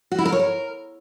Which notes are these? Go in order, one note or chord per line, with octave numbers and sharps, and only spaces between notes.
F#4
E4
A#4
C#5
A#4